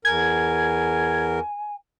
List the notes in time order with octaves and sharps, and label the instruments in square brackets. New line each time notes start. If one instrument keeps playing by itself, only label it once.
[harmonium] E2 A#4 [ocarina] G#5 [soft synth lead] G#6